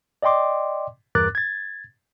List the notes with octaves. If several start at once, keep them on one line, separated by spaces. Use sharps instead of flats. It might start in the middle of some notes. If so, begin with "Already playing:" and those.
D5 D#5 G5 C6 D6
E2 G2 A#4 D6 F#6 A6
G#6 A6